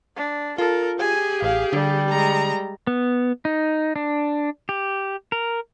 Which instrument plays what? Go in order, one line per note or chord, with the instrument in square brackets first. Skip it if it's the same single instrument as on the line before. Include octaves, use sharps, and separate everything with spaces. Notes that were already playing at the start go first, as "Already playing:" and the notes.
[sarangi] D4
[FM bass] F4 [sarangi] A4 [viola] A#4
[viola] G4 G#4 [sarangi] G#5
[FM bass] A1 [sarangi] F5
[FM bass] D3 [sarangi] G3
[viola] G#3 A#5
[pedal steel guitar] B3
D#4
D4
G4
A#4